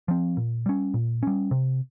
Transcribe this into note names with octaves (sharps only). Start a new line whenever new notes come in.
F3 C4
A#2
G3 C#4
A#2
G3 C#4
C3